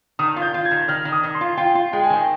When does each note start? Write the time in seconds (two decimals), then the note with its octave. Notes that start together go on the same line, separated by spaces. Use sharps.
0.19 D#3 D#6
0.36 F4
0.42 G6
0.54 F4
0.65 G#6
0.71 D#3
0.88 D#3 F6
1.05 D#3
1.12 D#6
1.23 D#3
1.35 C6
1.41 F4
1.57 F4 G5
1.75 F4
1.93 G#3 G5
2.03 G#5
2.10 D#3 G5